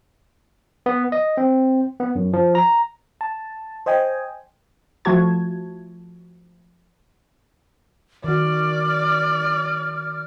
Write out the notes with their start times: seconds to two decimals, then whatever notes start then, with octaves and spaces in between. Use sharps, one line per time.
0.86 B3
1.12 D#5
1.37 C4
2.00 B3
2.15 F#2
2.33 F3
2.55 A#5
3.21 A5
3.86 C5 D#5 G5 G#5
5.05 F3 A3 F4 F#4 A5 G#6
8.24 D#3 F#4 D5 F6